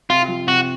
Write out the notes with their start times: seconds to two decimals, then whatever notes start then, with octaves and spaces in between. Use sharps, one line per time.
0.09 C3 F4
0.28 F3
0.47 C3 F#4